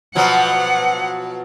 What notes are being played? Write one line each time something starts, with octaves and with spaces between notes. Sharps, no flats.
B2 F3 F#3 F#5